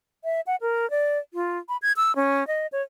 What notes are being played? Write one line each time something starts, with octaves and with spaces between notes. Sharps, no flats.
E5
F#5
A#4
D5
F4
B5
G#6
E6
C#4
D#5
C#5